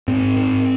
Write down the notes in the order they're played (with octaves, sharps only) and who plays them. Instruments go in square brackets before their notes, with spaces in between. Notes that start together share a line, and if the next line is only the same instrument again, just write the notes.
[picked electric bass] G#2 C4
G#2